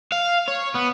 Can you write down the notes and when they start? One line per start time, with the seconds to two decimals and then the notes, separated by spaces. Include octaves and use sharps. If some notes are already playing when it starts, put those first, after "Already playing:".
0.12 F5
0.48 C#5
0.75 B3